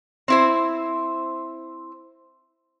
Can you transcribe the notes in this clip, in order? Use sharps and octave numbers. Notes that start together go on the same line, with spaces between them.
C4 E4 C5